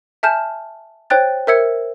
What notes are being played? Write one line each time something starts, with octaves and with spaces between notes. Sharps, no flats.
E5 G#5 A5 F6 G6 E7
C5 C#5 G5 F#6 A6
A#4 C5 E5 E6 G#6 C#7